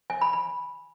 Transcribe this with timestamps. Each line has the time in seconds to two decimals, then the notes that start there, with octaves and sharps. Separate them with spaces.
0.10 G#5
0.21 B5
0.33 B5